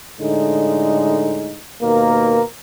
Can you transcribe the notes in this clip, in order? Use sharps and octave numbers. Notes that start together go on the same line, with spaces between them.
A2 D3 G#3 D#4
D#2 B2 A#3 A#4